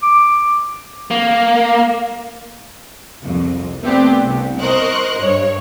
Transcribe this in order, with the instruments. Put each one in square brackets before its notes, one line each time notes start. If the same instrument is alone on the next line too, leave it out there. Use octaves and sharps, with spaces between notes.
[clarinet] D6
[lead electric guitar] A#3
[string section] C2 F2
A3 B3 C4 D4 G4
C2
A#4 C5 D#5 C#6 F#6
G2 C#5